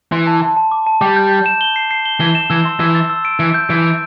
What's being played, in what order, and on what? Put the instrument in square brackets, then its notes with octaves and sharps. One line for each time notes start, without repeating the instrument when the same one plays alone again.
[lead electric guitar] E3 [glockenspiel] C6
[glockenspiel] A5
A5
A5
D6
A5
[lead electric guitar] G3 [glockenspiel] D6
[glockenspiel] G6
G6
E7
G7
C7
C7
G7
[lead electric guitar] E3 [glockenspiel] G7
[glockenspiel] E7
[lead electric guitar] E3 [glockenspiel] E6
[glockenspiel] C6
[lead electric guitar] E3 [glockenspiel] E6
[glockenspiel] A6
E6
D7
[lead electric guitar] E3 [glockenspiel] D7
[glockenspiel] G6
[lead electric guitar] E3 [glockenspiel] D7
[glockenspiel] D7